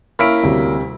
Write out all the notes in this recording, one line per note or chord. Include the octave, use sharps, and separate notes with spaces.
A#3 C#4 E4 F6 B6 D7
D2 C3 G3